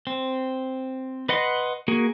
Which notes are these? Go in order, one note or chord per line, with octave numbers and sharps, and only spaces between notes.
C4
B4 D#5 F#5 C6
A#3 F#4 G#4